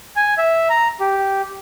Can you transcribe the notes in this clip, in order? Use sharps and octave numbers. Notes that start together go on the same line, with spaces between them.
G#5
E5
A#5
G4